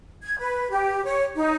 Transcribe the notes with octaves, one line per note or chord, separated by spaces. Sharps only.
G#6
B4
G4
C#5
D#4